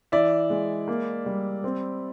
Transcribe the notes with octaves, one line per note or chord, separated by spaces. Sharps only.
E3 D5 E5
G#3
A#3
G3
C4